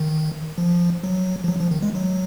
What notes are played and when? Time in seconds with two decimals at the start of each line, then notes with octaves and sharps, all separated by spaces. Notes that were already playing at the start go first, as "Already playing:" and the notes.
Already playing: D#3
0.58 F3
1.04 F#3
1.44 F3
1.48 F#3
1.60 F3
1.71 D#3
1.82 G#3
1.95 F#3